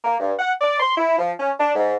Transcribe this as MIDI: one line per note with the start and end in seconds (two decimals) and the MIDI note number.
0.05 0.16 58
0.20 0.32 43
0.39 0.53 78
0.61 0.79 74
0.80 0.95 84
0.98 1.19 64
1.19 1.33 53
1.40 1.52 61
1.59 1.71 62
1.76 1.95 44